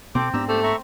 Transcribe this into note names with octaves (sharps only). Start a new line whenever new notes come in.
B2 C4 A4 D6
G#2 B3 D4 G4 A#5 E6
A3 G4 C5 E6
E5 A#5 C#6